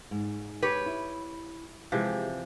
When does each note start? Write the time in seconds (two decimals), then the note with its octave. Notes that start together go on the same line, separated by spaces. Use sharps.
0.11 G#2
0.63 G4 B4 C#5
0.86 E4
1.92 C3 E3 F3 G#3 G4 G#4